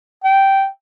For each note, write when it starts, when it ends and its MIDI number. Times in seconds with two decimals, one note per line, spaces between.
0.24 0.67 79